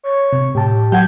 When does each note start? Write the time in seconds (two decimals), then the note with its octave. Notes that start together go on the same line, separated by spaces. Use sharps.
0.04 C#5
0.33 C3
0.55 A2 G4 A5
0.92 F#3 F#5 G6 G#6